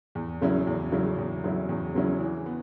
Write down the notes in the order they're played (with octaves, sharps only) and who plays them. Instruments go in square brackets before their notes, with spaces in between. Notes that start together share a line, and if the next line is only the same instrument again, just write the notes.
[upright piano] E2
C#3 F#3 C#4 E4
E2
C#3 F#3 C#4 E4
E2
C#3 F#3 C#4 E4
E2
C#3 F#3 C#4 E4
E3
B3